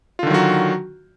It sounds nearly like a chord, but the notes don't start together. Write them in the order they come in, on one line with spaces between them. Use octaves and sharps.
F4 D3 D#3 F#3 F#4